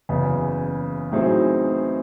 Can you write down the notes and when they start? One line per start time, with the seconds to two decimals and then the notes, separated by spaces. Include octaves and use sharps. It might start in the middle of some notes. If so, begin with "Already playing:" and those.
0.09 F#1 E2 C#3
1.12 A2 F#3 C4 D#4 G#4